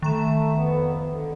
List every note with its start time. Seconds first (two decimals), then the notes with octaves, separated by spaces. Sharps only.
0.02 D#3 A3 A#5 E7
0.54 F2 B3
1.08 D3